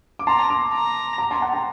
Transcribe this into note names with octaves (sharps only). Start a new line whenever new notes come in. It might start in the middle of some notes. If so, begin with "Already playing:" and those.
D6
A5 A#5 C6
A#5 D6
A#5
A#5 D6
A5 C6
F#5 A5
G5 A#5